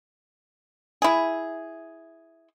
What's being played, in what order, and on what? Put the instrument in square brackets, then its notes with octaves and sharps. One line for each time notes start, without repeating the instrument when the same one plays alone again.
[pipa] E4 G#4